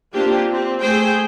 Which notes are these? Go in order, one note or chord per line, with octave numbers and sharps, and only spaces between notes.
A#3 C4 D4 F4 G4
C4
A3 G#4 C5 G5